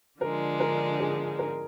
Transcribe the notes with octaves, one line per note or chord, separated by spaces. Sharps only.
D3 F3 G#3 D4 A#4
A#4
G#4
A#4